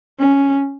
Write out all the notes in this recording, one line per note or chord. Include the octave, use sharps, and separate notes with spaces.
C#4